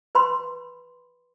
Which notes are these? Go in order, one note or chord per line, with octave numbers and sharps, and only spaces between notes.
B4 B5 C6